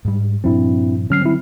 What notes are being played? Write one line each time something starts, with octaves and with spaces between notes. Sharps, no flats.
G#2 G3
G2 A#2 F3 C4 D4 E4
D3 F#3 G3 C#4 F6 C7
C4 E4